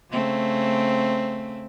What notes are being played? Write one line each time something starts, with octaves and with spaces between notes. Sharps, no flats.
C#3 A3 C4